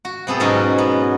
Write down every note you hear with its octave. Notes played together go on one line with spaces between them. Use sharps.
F#4
C3 B3 G#4 A4
G#2 B2 F#3 C#4 D#4 F#4
B3